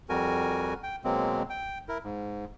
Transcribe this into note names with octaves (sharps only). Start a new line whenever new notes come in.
F2 G3 F#4 A#4 G#5
G5
B2 F#3 G#3 A#3 C4
G5
E4 A#4
G#2